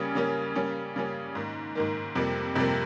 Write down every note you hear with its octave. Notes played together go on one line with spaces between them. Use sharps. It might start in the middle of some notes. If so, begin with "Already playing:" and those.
Already playing: C#3 G3 A#3 C#4
C#3 G3 A#3 C#4
C#3 G3 A#3 C#4
C#3 G3 A#3 C#4
G#2 D#3 A#3
G#2 D#3 A#3
F2 C3 G3 A#3
F2 C3 G3 A#3